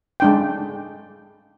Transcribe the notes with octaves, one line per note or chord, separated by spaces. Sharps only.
G#3 D4 G5